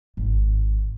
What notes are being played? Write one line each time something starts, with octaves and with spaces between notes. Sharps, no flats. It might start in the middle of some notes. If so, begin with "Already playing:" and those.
G#1